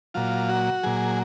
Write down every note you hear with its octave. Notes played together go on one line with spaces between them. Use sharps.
A#2 F#3 F4
F#4
A#2 F#3 G#4